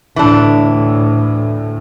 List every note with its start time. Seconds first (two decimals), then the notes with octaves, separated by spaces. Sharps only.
0.16 D2 A2 E3 D4